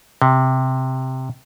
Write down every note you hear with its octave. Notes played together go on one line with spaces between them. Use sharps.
C3